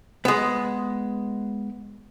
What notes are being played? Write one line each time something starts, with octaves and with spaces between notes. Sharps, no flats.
G#3 B3